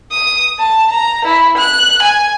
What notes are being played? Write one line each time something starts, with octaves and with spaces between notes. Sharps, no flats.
D#6
A5
A#5
E4
F#6
G#5